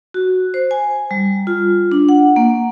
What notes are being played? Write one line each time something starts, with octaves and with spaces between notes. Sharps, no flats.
F#4
C5
G#5
G3
F4
D4
F#5
A#3